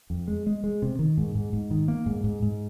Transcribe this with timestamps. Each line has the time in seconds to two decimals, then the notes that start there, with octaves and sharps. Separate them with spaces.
0.10 F2
0.28 G#3
0.46 G#3
0.64 G#3
0.82 C3
0.99 D#3
1.17 G#2
1.35 G#2
1.53 G#2
1.71 D#3
1.88 A#3
2.06 G#2
2.24 G#2
2.42 G#2